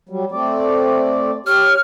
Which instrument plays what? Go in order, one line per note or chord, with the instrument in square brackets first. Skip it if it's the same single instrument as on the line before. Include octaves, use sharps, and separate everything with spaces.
[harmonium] F#3 G3
A3 C4 D5
[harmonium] G4 C#5 [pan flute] F6